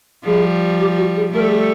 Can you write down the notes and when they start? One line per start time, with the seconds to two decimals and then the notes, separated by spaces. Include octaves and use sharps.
0.25 F3 G3 G#4
0.79 G4
0.97 F#4
1.15 G#4
1.33 G3 A3 A#4
1.41 A4
1.49 G#4
1.57 A4